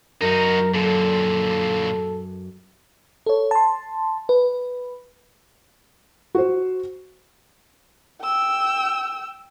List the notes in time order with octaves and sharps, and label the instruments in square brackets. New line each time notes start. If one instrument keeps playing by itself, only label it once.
[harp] F#2 [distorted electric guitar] D#4 F#4 [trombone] A#4
[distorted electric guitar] A#2 D3 [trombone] A4
[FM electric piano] A4 C#5
A5 C6
B4
[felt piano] F#4 C5
[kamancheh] G5 E6